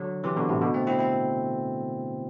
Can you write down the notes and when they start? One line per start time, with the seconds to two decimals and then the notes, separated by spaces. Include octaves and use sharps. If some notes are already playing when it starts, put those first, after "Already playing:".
Already playing: D3 F#3
0.24 C3 E3
0.36 B2 D3
0.49 A2 C3
0.61 B2 D3
0.74 A3 C4
0.87 C4 E4
0.99 C4 E4